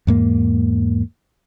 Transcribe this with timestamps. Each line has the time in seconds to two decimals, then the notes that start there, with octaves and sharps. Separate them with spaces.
0.07 E2 G#2 A#3